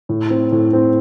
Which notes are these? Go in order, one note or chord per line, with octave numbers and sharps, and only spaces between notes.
A2
C4
A2
C4